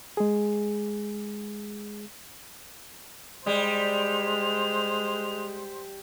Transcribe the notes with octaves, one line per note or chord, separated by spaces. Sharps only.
G#3 G#4
G3 G#3 C5 F7